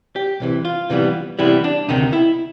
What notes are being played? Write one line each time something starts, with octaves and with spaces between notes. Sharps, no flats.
G4
C2 C3 E3
F4
C3 E3 G3 B3
C3 E3 G3 B3 E4
D4
D2 C3 D#3 D#4
E4